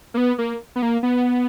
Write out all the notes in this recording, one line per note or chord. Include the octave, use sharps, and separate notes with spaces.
A#3
B3
A#3
B3
A#3
B3